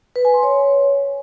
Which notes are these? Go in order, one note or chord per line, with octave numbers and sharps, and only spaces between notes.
B4
G#5
C6
C#5